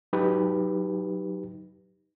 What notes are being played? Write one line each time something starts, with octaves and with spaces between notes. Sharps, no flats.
F#3 D#4 G4 B4